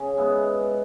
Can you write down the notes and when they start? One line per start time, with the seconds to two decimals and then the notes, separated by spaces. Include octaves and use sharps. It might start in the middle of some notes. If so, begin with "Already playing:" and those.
Already playing: C#3
0.17 G#3 B3 E4